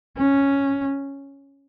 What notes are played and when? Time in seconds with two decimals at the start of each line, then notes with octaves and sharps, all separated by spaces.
0.17 C#4